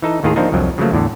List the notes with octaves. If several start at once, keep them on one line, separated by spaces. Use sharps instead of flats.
E3 D#4 A4
D#2 A2 D#3 F4 G#4 A#5
F3 A#3 C4 D4 D#4
C2 F2 F3 F#3
C#3 F3 F#3 A3 A#3
E2 A2 D3